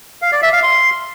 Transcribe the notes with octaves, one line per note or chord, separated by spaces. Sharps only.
F5
D5
E5
F5
C6